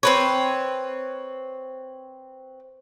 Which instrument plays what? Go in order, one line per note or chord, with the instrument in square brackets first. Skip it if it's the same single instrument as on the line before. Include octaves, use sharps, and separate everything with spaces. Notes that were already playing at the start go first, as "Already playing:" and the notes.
[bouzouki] C4 B4 C#5